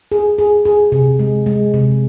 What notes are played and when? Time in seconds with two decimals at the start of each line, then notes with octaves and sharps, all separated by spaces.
0.12 G#4
0.38 G#4
0.65 G#4
0.92 C3
1.19 G#3
1.46 G#3
1.74 C3